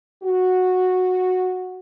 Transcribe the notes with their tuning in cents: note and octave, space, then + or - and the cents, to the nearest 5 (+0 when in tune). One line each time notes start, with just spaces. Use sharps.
F#4 -10